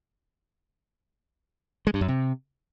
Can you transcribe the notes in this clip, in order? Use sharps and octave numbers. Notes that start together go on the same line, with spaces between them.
G#3
G2
F#2
C3